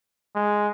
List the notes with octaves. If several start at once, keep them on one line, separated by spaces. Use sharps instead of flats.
G#3